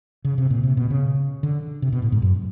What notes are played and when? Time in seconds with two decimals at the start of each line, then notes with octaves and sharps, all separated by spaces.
0.25 C#3
0.38 C3
0.50 A#2
0.63 C3
0.77 B2
0.90 C#3
1.43 D3
1.82 C3
1.92 B2
2.02 A2
2.12 G#2
2.22 F#2